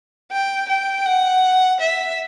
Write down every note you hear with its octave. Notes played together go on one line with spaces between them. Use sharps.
G5
G5
F#5
E5